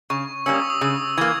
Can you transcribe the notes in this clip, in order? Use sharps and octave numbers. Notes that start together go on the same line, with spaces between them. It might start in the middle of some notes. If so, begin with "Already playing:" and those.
C#3 C#6
G3 A#3 C#4 E6
D#6
C#6
D#6
C#3 E6
E3 A#3 G#6